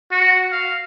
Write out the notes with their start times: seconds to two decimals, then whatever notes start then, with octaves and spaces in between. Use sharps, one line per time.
0.12 F#4
0.52 F5